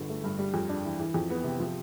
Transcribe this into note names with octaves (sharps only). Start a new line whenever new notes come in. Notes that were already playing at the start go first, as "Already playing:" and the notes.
Already playing: G1 D3
A3
G2
G3
F2
D4
E3
E3
F2
B3
C3
F3